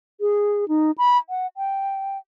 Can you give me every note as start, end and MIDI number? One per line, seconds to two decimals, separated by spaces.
0.21 0.68 68
0.68 0.91 63
0.98 1.17 83
1.29 1.47 78
1.57 2.18 79